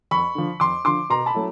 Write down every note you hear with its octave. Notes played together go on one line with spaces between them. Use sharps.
F2 B5 C#6
D3 F3
F2 C6 D6
D3 F3 C6 D6
B2 A#5 C6
A5 B5
F#3 A3 C#4 E4